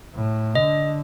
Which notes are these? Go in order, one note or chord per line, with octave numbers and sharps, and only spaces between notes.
A2
D3 D#5